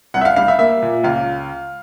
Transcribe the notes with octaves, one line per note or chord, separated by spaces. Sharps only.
C2 F#5
E5
F5
G3 F5
E5
A#3 E5
A#2
C#2 F5